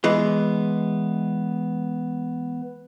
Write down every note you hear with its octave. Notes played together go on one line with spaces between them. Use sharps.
E3 G#3 B3